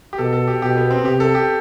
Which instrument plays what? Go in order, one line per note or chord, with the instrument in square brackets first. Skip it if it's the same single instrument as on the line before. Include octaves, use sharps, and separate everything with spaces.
[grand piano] G4
[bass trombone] B2 [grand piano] A4
[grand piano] A4
G4
[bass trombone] B2 [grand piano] G4
[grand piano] B3
C4
[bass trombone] C3 [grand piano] G4
[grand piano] A4
G4